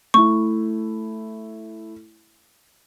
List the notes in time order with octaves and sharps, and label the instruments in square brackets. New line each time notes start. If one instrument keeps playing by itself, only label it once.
[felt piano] A3 E4 [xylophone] C#6